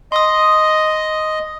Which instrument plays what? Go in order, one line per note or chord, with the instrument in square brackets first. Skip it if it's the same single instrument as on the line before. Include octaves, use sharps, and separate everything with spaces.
[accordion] D#5 [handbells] C6 D#6